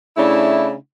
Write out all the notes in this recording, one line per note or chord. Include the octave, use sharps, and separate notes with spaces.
C#3 A3 D4 E4